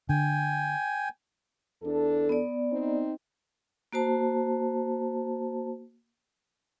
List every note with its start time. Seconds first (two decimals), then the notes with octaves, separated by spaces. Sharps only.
0.09 D3 G5 G#5
1.83 E2 D4 A4
2.29 B3 D5
2.72 C4 D#4
3.93 A#3 F#4 C5 A5